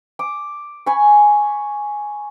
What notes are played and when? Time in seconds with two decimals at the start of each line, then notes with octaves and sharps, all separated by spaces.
0.19 D6 D#6
0.86 G#5 B5 C#6